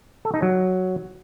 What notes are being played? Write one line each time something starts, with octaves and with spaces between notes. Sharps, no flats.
A4
D#4
F#3